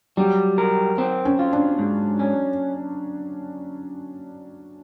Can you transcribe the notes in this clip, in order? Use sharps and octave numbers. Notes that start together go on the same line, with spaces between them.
F#3 G3
A#4
C4
C#4
F4
D4
G#2
C#4